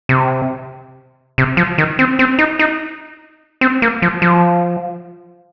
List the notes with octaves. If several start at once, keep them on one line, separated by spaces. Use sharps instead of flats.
C3
C3
F3
D#3
C4
C4
D#4
D#4
C4
A#3
F3
F3